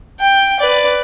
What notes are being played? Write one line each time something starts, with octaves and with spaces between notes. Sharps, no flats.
G5
B4 D5